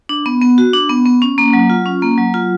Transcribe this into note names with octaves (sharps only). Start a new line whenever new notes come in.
D4
B3
B3
F#4
D4
B3
B3
C#4
A#3
F#3
F4
C#4
A#3
F#3
F4